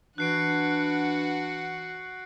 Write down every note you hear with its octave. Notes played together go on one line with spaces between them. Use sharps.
E3 D4 F#4 F#5 F#6 C7 D7